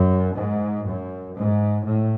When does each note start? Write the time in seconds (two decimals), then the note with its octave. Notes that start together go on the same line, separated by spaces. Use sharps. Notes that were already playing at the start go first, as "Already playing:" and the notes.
Already playing: F#2
0.35 G#2
0.85 F#2
1.34 G#2
1.84 A2